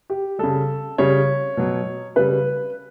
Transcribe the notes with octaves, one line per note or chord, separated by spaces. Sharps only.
G4
C#3 G3 A4
C#3 G3 C#5
B2 F#3
C#3 G3 B4